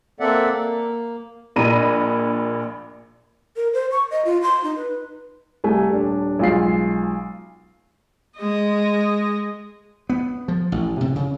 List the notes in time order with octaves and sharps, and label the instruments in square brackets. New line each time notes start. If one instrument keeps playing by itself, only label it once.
[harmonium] A#3 C4 A4 D5 E5 F#5
A#3
[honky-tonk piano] A#1 A#2 D4 D#5 B5 D#7
[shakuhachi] A#4
C5
C#6
D#5
F4
C6
D#4
B4
[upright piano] C2 A3 G#5
D#1 D4
B1 G#3 F4 F5 C7
[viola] G#3 D#5
[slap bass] B3
F3
A1
C3
C#3